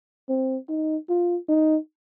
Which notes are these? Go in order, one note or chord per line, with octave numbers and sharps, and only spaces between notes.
C4
D#4
F4
D#4